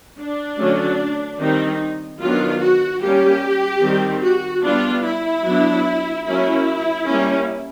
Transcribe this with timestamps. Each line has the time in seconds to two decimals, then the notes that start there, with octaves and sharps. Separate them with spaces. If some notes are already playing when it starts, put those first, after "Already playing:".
0.18 D4
0.58 D3 F#3 A3 C#4
1.39 D#3 G3 C4 D#4
2.20 D#3 F#3 B3 D4 F4
2.62 F#4
3.02 G3 A#3 C#4 G4
3.83 D#3 G3 C4
4.24 F#4
4.64 G3 B3 D4 F4
5.05 E4
5.45 F#3 B3 D4
6.27 F#3 A#3 C#4 E4
7.08 G3 A#3 C#4